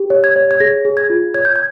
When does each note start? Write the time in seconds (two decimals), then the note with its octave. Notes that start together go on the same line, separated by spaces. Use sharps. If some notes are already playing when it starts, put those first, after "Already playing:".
Already playing: G4
0.10 C#5
0.24 G#6
0.36 C#5
0.51 G#6
0.60 G#4 A#6
0.85 G#4
0.97 G#6
1.10 F4
1.34 C#5 G#6
1.45 G6
1.56 G#6